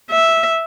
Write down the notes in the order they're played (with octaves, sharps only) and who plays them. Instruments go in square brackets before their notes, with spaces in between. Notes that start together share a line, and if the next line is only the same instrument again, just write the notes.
[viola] E5